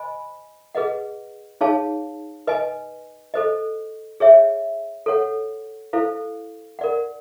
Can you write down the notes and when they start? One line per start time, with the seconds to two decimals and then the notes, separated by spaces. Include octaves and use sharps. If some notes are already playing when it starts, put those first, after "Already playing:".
Already playing: C5 D#5 G#5 B5
0.75 G#4 B4 D#5 F#5
1.61 D#4 G#4 C#5 F5 A5
2.47 B4 D#5 G#5
3.34 A4 C5 D#5
4.20 G#4 C#5 E5
5.06 A4 C#5 F#5
5.93 E4 A4 C5 F5
6.79 A#4 D5 F#5